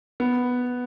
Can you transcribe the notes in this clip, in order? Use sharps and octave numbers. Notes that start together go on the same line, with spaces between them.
B3